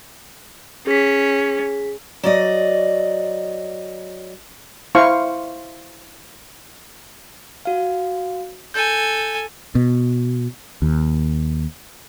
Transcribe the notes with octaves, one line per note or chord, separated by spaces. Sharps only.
C#4 G#4 B6
F#3 D5 D#5
E4 C5 F5 C#6
F#4 F5
A4 G#5 G6
B2
D#2